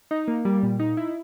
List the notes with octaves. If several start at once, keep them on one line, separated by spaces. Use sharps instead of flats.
D#4
A#3
G3
A#2
D#4
E4